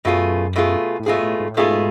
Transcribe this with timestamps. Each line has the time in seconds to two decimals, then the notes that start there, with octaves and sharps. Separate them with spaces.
0.05 F#2 B2 A3 F4 G#4
0.56 B2 A3 F4 G#4
1.00 A2
1.06 G#2 B2 A3 F4 G#4
1.22 A2
1.39 G#2
1.50 A2
1.57 G#2 B2 A3 F4 G#4